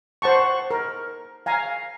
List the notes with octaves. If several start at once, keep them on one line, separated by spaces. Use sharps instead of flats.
C5 F#5 A5 C#6
A#4
F5 G#5 A#5